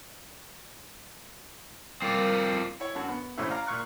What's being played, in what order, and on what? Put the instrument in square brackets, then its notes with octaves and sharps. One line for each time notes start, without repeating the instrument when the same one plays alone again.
[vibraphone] G3 A#4 [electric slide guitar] C4 F4 D5
[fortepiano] E4 C#5
F#2 D3 F#4 A5
B3
A1 E3 A3 C#4 C5 E5
D5 F5 A#5
A#2 C#6 F6 F#6